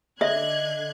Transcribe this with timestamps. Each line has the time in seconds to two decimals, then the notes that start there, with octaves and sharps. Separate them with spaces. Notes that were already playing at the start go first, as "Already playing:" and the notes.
0.21 D3 D#5 E5 F#6 G#6